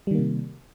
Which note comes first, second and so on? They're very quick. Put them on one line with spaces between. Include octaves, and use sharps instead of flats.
G3 D#3 A#3 C3